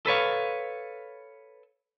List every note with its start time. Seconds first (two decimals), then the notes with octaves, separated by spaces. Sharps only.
0.06 A4 B4 C#5 F5